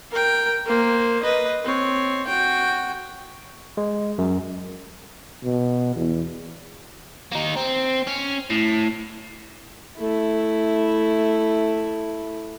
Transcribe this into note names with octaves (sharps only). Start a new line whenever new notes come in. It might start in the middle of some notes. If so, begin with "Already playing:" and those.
A#4 G5
A#3 C5
B4 D#5
C4 C#5
F#4 G5
G#3
F#2
B2
E2
A#3 D#4
C4
C#4
A2
A3 E4